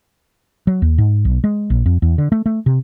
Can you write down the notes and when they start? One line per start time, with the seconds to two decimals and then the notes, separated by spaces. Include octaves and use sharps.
0.67 F#3
0.82 D#2
0.98 G#2
1.25 B1
1.44 G#3
1.70 A#1
1.86 F2
2.02 E2
2.18 D3
2.32 A3
2.46 A3
2.66 C3